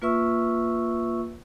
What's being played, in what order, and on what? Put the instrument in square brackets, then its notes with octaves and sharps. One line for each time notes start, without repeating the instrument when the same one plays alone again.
[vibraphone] A#3 F4 B4 E5 C#6 E6